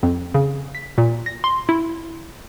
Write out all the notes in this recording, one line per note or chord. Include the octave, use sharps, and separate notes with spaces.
F2
C#3
B6
A#2
A#6
C6
E4